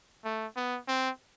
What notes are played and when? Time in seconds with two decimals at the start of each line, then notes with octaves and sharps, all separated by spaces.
0.24 A3
0.56 B3
0.88 C4